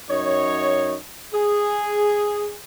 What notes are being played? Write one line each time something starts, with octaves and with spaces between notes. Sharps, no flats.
F#2 D#4 C#5
G#4